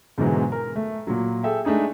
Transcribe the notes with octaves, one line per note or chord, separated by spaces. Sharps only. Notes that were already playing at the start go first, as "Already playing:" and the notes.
G#2 B2 D3 E3 F#3 G#3
A#4
A3
A#2 F#3
G#4 A4 E5 G5
G#3 A3 D4 D#4 G#4